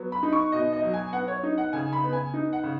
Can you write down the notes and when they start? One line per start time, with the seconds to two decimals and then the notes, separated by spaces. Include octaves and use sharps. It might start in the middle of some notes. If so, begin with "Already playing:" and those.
Already playing: F#3 B3
0.12 B5
0.23 D#4
0.33 C#6
0.52 B2 D#5
0.73 D#5
0.83 F#3
0.94 G#5
1.12 B3 F#5
1.28 C#5
1.43 D#4
1.58 F#5
1.73 C#3 G#5
1.93 B5
2.04 B3
2.13 G#5
2.34 D#4
2.53 F#5
2.63 C#3